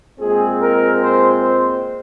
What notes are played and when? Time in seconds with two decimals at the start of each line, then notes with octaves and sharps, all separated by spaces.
0.19 A#2 G#3 C4 G#4
0.60 A#4
1.01 C5
1.42 C5